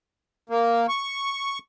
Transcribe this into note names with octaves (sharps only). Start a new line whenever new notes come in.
A#3
C#6